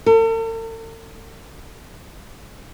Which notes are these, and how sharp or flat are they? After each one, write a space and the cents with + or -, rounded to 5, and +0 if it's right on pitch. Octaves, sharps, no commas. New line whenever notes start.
A4 +45